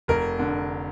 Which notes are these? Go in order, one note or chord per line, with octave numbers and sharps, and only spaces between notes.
F1 A#4
D3